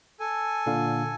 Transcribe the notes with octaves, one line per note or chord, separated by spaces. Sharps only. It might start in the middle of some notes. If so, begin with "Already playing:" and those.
A4 G#5
A#2 D3 F5